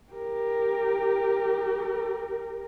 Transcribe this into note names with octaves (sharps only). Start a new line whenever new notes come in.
G4 A#4